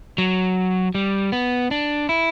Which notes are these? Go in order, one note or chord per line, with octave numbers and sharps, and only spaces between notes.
F#3
G3
B3
D4
E4